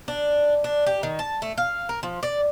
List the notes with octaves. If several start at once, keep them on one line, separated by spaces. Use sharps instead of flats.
D4
D4
G4
D#3
A5
A3
F5
A#4
F3
D5